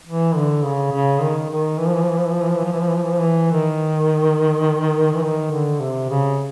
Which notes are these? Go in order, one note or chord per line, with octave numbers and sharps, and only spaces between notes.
E3
D3
C#3
C#3
D#3
D#3
E3
F3
E3
F3
E3
F3
E3
F3
E3
F3
E3
F3
E3
F3
E3
F3
E3
F3
E3
D#3
E3
D#3
D3
C3
C#3